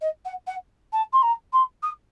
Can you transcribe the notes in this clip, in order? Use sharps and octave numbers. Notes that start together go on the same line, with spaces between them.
D#5
F#5
F#5
A5
C6
A#5
C6
D#6